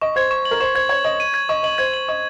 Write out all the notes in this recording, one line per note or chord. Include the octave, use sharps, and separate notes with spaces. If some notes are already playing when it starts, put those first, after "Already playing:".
D#5 C#6
C5 G#6
C#6
F#7
A#4
C5 C#6
C5 G#6
C#5 G#6
D#5 F#7
D#7
G#6
D#5 C#6
D#5 F#7
C5 G#6
F#7
D#5 C#6